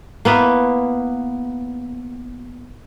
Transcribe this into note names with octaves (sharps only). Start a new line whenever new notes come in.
A#3 B3 E4 B4